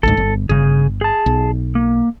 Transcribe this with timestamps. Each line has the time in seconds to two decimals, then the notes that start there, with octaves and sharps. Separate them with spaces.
0.03 A1 D2 G#2 A4
0.17 G1
0.49 G1 C#3 G#4
1.01 G#4 A5
1.26 B1
1.75 A#3